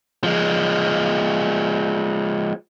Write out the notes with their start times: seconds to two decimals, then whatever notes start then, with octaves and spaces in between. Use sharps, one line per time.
0.23 F3 G#3